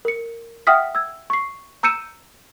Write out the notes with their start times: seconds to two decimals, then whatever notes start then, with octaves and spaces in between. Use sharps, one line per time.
0.05 A#4 C#7
0.67 E5 F#5 G5 D#6 F6 B6
0.95 E6 G#6
1.30 C#6 C7
1.83 A#5 E6 G6 C#7 D#7 E7